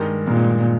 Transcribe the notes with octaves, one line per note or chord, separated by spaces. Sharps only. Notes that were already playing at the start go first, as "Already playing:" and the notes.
Already playing: G2 D#3 G#3
G2 A#2 D#3 G#3